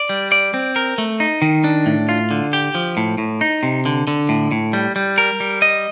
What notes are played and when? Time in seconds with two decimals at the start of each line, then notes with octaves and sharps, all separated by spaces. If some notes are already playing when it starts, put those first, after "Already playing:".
Already playing: D5
0.09 G3
0.32 D5
0.54 C4
0.76 A#4
0.98 A3
1.20 D#4
1.42 D#3
1.64 D4
1.86 A2
2.09 F4
2.31 D3
2.53 G4
2.75 F3
2.97 A2
3.18 A2
3.41 D#4
3.63 C3
3.85 D3
4.08 D3
4.29 A2
4.51 A2
4.73 G3
4.96 G3
5.18 A#4
5.40 G3
5.62 D#5